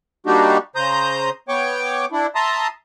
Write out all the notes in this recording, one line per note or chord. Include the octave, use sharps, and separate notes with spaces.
G3 A#3 D4 D#4 F#4 G4
C#3 C5 A#5 D#6 G6
B3 C#5 G5 C#6 D6
D4 E4
E5 A5 A#5 C6 D#6